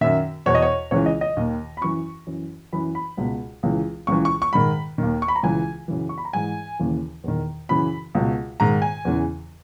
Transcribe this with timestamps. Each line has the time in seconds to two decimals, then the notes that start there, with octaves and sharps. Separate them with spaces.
0.01 F#2 D#3 E5
0.46 E2 B2 C#5
0.55 D#5
0.62 C#5
0.91 C#2 C#3 E3 C#5
1.06 D#5
1.21 D#5
1.37 D#2 D#3
1.77 B5
1.81 F#2 E3 C#6
2.27 F#2 E3
2.73 F#2 E3 B5
2.95 B5
3.17 C#2 B2
3.63 C#2 C#3 E3
4.07 C#2 C#3 E3 C#6
4.25 C#6
4.42 C#6
4.53 G#2 D#3 B5
4.98 D#2 D#3
5.22 C#6
5.28 B5
5.36 A#5
5.43 C#2 C#3 E3 G#5
5.88 F#2 C#3 E3
6.09 C#6
6.18 B5
6.25 A#5
6.33 G#2 E3 G#5
6.79 D#2 C#3 E3
7.24 E2 D#3
7.69 F#2 C#3 E3 B5
8.15 C#2 B2
8.60 G#2 D#3 A#5
8.82 G#5
9.05 E2 C#3 E3